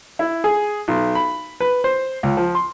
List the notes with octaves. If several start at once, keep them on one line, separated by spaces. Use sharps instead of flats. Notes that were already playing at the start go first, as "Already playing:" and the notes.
E4
G#4
B1
B5
B4
C5
C#2
F3
C6